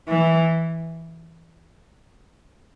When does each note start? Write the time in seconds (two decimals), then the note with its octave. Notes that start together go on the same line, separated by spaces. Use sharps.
0.08 E3